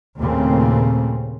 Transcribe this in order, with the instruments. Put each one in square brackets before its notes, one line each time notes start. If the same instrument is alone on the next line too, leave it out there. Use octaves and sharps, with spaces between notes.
[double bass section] D#2 A#2 C#3 A3 A#3 C4